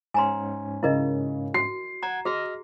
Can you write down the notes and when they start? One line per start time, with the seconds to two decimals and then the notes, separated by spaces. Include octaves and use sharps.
0.14 G#2 C#4 G#5 A#5 C6
0.83 C#3 E4 A#4 D#5
1.54 F#4 C7
2.02 F#5 A#5 G#6
2.25 F#4 G#4 D#5 F6 A#6